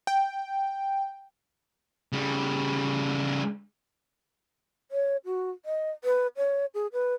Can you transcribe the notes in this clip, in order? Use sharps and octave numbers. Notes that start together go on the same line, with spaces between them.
G5
C#3 G3
C#5
F#4
D#5
B4
C#5
G#4
B4